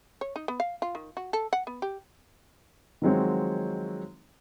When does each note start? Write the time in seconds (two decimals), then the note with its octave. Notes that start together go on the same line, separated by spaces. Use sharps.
0.21 C#5
0.36 D#4
0.48 B3
0.60 F5
0.82 F4
0.95 D#3
1.17 F#4
1.33 A4
1.53 F#5
1.67 B3
1.82 G4
3.02 D#3 F3 F#3 G#3 C4 C#5